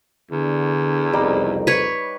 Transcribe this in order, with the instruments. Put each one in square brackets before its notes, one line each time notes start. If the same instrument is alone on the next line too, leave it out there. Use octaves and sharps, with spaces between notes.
[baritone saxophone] E2 [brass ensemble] D3
[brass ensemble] F#1 C2 F2 [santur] G3 D#4
[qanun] B4 C#5